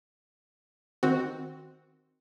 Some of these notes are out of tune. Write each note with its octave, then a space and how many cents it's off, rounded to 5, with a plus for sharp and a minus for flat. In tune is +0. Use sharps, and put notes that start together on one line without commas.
D#3 +0 C4 +0 F#4 +0